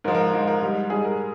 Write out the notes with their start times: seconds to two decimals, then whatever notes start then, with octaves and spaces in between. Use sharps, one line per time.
0.04 G#2 A#4
0.08 F3
0.15 A#4
0.33 G#2 F3
0.47 A#4
0.62 G#2 G3
0.90 G#2 G3 G#4
1.05 A#4